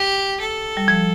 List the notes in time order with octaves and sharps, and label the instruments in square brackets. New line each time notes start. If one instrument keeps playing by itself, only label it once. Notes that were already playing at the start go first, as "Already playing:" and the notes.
Already playing: [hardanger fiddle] G4
A4
[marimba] G3
F3